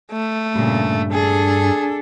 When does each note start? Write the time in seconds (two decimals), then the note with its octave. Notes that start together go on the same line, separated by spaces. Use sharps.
0.12 A3
0.55 G2 A#2 C#3
1.13 D4 G#4 A4